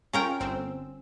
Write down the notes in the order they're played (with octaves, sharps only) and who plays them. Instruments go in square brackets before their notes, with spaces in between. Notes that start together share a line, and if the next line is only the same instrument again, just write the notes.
[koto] C#4 A#4 G5 [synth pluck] F4
[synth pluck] G1 C4 E6